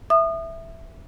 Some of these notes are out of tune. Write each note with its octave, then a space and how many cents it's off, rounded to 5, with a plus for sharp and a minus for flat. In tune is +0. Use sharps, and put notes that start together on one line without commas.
E5 +0 D#6 -30